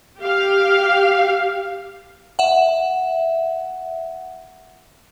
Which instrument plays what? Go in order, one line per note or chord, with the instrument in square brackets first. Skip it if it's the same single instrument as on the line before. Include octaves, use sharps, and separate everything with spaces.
[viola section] G4 F5
[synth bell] E5 F#5